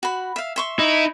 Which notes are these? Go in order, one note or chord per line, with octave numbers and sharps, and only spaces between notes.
F#4 B5
E5 F5
E5 C6 C#6
D#4 E4